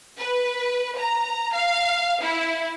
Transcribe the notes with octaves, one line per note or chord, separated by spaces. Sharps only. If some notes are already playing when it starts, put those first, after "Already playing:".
B4
A#5
F5
E4